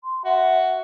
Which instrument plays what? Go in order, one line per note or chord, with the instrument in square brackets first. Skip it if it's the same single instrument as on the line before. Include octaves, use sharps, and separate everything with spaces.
[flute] C6
[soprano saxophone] F#4 [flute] E5